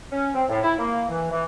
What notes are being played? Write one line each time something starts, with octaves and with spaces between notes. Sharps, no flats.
C#4
C4
A2
E4
A#3
E3
E3